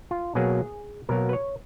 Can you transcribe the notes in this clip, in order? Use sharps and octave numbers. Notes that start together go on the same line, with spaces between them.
F4
B2 F#3 A#3 G#4
B2 F#3 A#3 A#4
B4
C#5